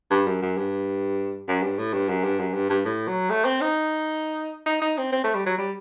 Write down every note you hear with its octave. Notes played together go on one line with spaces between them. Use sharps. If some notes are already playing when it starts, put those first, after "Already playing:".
G2
F#2
F#2
G2
F#2
G2
A2
G2
F#2
G2
F#2
G2
G2
A2
F#3
A3
C4
D#4
D#4
D#4
C4
C4
A3
G3
F#3
G3